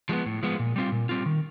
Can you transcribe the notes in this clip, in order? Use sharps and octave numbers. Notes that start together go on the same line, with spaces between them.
F3 G#3 B3
A2
F3 G#3 B3
A#2
G3 C4 F4
A#2
G3 C4 F4
D#3